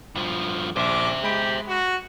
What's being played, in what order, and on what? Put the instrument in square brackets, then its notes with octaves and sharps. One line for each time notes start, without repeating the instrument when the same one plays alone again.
[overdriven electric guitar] G2 F3
[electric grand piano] A#1 [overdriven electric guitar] C5 E5 [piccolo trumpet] D6
[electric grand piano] G#3 B5 D7 [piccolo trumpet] G4
[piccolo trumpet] F#4